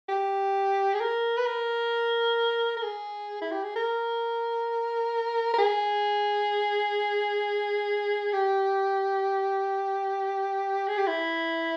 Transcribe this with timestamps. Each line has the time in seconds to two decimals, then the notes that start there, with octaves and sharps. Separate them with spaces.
0.09 G4
0.94 G#4
1.01 A#4
1.38 B4
1.46 A#4
2.77 A#4
2.83 G#4
3.42 E4
3.52 G4
3.64 G#4
3.76 A#4
5.54 A#4
5.59 G#4
8.33 G4
10.88 G#4
10.98 G4
11.08 E4